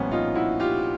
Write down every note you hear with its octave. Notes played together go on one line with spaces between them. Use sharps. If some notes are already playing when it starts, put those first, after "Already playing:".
Already playing: C2 A#2 F3 B3 C#4
D#4 F4
E4 F#4
F4 G4